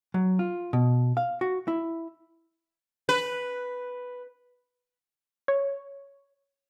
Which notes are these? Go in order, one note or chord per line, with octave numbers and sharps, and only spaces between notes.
F#3
F4
B2
F5
F#4
E4
B4
C#5